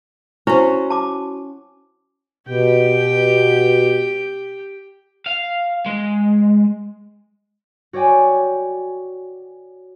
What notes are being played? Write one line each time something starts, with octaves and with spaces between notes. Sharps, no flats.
C#4 E4 F#4 C5
A5 D6
B2 G4 G5
F5
G#3
F#4 C#5 D5 G5 G#5